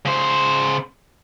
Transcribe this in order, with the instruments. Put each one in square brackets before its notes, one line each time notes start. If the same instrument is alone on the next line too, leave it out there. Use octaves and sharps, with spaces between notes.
[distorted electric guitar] C#3 C5